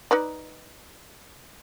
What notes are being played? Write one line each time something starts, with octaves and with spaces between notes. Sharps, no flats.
D#4 B4 D5